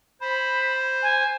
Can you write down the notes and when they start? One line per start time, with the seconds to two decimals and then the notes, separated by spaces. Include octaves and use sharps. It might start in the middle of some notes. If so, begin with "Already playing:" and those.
0.21 C5 B5
1.02 G#5